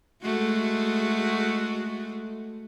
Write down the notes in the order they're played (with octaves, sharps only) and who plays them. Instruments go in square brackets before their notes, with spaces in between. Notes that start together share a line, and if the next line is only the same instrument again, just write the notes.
[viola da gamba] G#3 A3 F#4